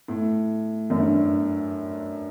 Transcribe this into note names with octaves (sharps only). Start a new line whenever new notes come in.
A2
F#2
G2